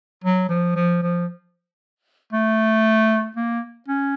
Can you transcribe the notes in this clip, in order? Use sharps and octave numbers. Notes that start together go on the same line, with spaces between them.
F#3
F3
F3
F3
A3
A#3
C#4